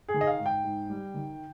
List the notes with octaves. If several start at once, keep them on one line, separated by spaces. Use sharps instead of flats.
G#4
D#3
D#5
F5
G#2
G5
G#2
G3
D#3